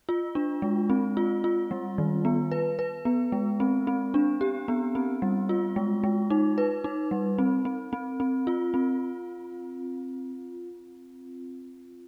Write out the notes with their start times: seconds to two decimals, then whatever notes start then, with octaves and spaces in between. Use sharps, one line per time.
0.09 F4
0.35 D4
0.62 G#3
0.90 C4
1.17 F4
1.44 F4
1.71 G3
1.98 D#3
2.25 B3
2.52 B4
2.79 B4
3.05 B3
3.32 G#3
3.60 C4
3.87 C4
4.14 D4
4.41 G4
4.68 B3
4.95 C4
5.22 G3
5.49 F4
5.76 G#3
6.04 G#3
6.30 D#4
6.58 B4
6.84 D#4
7.11 G3
7.39 C4
7.65 C4
7.93 C4
8.20 C4
8.47 F4
8.74 C4